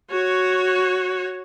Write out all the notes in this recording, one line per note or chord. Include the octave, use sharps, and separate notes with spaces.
F#4 C#5